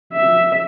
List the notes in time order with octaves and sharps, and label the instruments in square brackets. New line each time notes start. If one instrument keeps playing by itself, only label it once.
[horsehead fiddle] E5